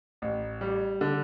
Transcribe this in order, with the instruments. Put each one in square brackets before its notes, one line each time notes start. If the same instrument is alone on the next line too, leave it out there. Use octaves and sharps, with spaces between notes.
[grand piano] A1
G3
D3